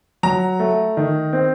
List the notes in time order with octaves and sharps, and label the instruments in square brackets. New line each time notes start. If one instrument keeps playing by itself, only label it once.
[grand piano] F#3 A#5
A3
D#3
C4